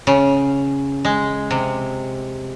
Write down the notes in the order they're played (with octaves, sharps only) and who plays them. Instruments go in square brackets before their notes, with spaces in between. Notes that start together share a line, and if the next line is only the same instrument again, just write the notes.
[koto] C#3
G#3
C3